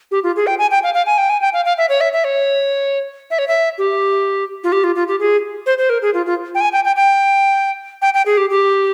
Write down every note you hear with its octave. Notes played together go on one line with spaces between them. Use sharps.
G4
F4
G#4
G5
G#5
G5
F5
F5
G#5
G5
G#5
G5
F5
F5
E5
C#5
E5
E5
C#5
E5
C#5
E5
G4
F4
G4
F4
F4
G4
G#4
C5
C5
A#4
G#4
F4
F4
G5
G#5
G5
G5
G5
G5
G5
G#4
G4
G4